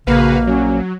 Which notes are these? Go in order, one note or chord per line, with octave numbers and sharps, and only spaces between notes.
A#1 C#3 A#3 F#4 B4 F5
F#3 C#4